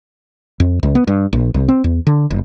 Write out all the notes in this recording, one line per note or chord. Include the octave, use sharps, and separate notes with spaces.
F2
C#2
B3
G2
A#1
C2
C4
E2
D3
F#1